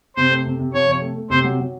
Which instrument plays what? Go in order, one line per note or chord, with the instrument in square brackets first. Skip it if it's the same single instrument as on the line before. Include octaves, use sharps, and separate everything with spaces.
[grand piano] C3 [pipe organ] C5
[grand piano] A3
C3
C3
[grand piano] F3 [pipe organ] C#5
[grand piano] C3
A3
A3
[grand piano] C3 [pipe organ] C5
[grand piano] F#3
F#3